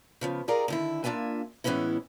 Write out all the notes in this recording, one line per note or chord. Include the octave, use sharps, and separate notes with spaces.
C#3 F3 B3
D#4 F4 G4 G#4 A#4 D5
D3 D#3 E4
A#3 D4 F4 E5 G#5
A2 E3 G#3 B3 C#4 E4